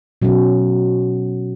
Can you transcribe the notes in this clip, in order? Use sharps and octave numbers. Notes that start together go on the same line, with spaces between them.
B2 F#3 C#4